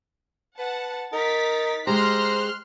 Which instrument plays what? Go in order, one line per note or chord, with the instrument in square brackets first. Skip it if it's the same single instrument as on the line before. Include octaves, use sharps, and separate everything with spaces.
[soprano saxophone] B4 [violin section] F#5 A5
[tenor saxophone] D#4 [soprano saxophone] A#4 [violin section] A6 B6
[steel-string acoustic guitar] G#3 G4 [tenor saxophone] C5 [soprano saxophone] A#5 [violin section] C6 F6 F#6